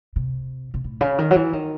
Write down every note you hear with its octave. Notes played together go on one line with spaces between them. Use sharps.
C3
C3
A2
C#3
D#3
F#3
E3
D#3